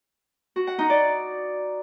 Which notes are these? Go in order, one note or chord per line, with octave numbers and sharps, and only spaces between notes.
F#4
F#5
D#4
D5